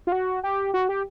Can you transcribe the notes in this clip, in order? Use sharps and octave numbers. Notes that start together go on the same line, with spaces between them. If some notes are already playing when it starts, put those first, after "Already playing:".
F4
F#4
G4
F#4
G4